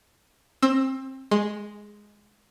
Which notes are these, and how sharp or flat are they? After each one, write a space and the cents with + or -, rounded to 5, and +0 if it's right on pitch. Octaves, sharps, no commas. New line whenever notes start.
C4 +25 E6 +0
G#3 +0 C6 +0